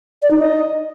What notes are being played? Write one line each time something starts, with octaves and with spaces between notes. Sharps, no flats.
D5
D#4
D#5